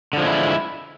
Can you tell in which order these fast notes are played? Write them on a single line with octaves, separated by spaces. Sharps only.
D3 F3 G#3 E4